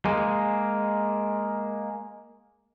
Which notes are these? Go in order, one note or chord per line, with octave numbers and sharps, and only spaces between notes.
G#3 A#3